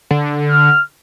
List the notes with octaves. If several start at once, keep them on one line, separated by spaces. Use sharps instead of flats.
D3
F6